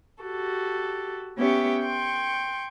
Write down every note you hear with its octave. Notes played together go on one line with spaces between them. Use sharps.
F#4 G4 A4
B3 C#4 G4 E5 G5
G5 C6 C#6